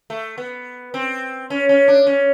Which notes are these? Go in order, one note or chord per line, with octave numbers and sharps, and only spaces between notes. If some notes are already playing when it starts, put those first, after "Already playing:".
A3
B3
C4
C#4
C#4
D4
C#4